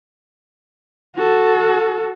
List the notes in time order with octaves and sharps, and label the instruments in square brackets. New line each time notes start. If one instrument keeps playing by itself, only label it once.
[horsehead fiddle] F#4 A4